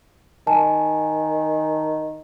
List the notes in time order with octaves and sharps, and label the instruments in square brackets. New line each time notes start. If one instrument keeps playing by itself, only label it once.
[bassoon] D#3 [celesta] G#5 A5